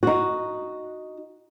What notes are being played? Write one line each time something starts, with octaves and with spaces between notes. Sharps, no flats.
D#4 F#4